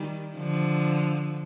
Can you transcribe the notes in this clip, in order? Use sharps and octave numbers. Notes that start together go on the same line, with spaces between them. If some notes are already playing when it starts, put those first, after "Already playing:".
Already playing: D#3 G3
D3 F3